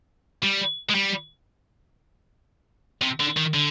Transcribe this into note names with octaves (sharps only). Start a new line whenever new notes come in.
G3
G#3
G3
C3
D3
D#3
D3